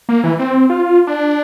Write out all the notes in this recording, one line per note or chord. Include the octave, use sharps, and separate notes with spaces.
A#3
E3
C4
F4
D4